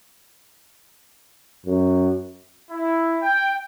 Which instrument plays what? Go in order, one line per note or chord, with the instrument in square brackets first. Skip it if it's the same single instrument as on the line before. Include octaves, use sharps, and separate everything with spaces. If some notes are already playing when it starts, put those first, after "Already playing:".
[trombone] F#2
[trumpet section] E4
G5